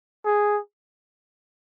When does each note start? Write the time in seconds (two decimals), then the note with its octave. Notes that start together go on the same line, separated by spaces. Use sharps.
0.25 G#4